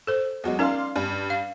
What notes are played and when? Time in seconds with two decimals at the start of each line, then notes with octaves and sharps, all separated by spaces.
0.07 A4 C5
0.44 E2 F#3 G#3
0.59 C#4 D#4 A#4 D5 F5 C6
0.96 G2
1.30 F5